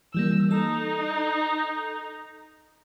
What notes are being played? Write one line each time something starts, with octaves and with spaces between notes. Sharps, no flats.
E3 G3 A#3 E6
D#4 A4